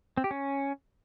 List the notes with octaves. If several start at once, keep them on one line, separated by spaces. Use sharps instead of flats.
C4
G4
C#4